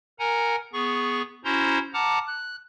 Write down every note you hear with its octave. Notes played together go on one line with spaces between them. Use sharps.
A#4 F#5 G#5 A#5
B3 G#4 C#6
C#4 E4 F#4 C5 A#5 C6
F#5 A5 A#5 D6 F6
F#6